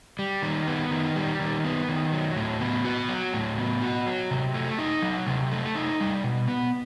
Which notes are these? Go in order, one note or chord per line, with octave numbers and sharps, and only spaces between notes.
G3
D#3
B3
D#3
G3
D#3
B3
D#3
F#3
A2
B3
F#4
F#3
A2
B3
F#4
F#3
C3
A3
D#4
F#3
C3
A3
D#4
G3
B2
B3